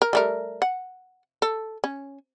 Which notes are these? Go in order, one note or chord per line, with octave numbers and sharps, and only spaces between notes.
A#4
G3 A3 A#4
F#5
A4
C#4